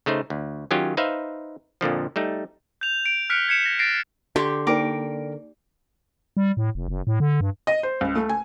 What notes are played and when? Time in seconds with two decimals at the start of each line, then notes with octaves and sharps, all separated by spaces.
0.06 C#3 A3 D#4 C5
0.30 D2
0.71 D#3 F#3 C#4 F4 G4
0.97 D#4 B4 C5 E5 F5
1.81 F2 A#2 D3 F3
2.16 G3 A3 D#4
2.81 G6 F7
3.06 D7
3.30 F6 F#6 B6 C#7 D7 F7
3.48 G#6 B6 C#7 D7 E7
3.64 G#6 A#6
3.79 A6 A#6 C7 D7
4.36 D3 G4 C6 C#6
4.67 A#3 D#4 A#4 D5 G5 D6
6.37 G3
6.57 A2
6.75 F1
6.88 F#1
7.07 A2
7.20 D3
7.41 G2
7.67 D#5
7.83 C5
8.01 C#2
8.15 A3
8.29 G#5